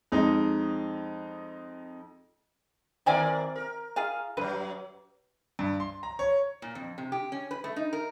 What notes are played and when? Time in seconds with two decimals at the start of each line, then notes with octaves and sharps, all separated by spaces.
0.12 F2 G#3 D#4
3.06 C3 D#3 A#4 D5 E5 G#5
3.56 A#4
3.96 F4 G#4 F5
4.37 F#2 F#3 B4
5.59 G2
5.80 C6
6.03 A#5
6.19 C#5
6.62 A#2
6.75 F2
6.98 C3
7.12 G4
7.32 C#4
7.51 B4
7.64 A3
7.76 D#4
7.93 A#4